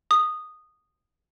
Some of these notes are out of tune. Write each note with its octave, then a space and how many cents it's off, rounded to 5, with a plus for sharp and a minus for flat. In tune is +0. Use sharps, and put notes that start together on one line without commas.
D#6 -10